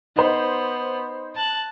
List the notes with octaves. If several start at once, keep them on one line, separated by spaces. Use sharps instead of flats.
B3 D#4 C5
A5 F#6